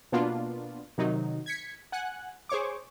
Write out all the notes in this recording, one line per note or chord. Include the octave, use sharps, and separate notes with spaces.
B2 A#3 B3 D4 F4
C3 D#3 F#3 D#4
G#6 B6 C#7
F#5 G#5 F#6
G#4 C5 C#5 C#6 D6